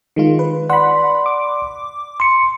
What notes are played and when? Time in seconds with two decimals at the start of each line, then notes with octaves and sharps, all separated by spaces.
0.16 D#3 G#3 F4
0.39 B4
0.69 D5 F#5 B5 C6
1.26 D6
2.20 C6 C#7